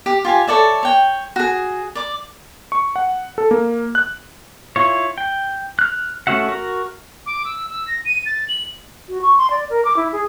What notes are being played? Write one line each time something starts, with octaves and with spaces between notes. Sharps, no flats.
G4
F4 G4 G#5
A4 C#5 D5 E5
C#5 G5
F#4 G#4
D5 D6
C#6
F#5
A4
A#3
F#6
E4 F4 C#5
G5
F6 F#6
A3 C#4 F#4 E5 F#5
F#4 A#4
D6
E6
E6
A#6
D#7
A6
F#7
F#4
C#6
C6
D5
A#4
D6
E4
G#4